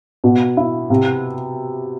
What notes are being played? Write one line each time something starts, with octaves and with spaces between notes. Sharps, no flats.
B2
E4
C3